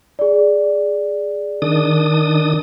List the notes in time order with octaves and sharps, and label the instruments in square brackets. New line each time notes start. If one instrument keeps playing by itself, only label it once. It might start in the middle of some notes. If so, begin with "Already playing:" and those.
[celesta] G#4 D5
[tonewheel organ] D#3 D4 D#6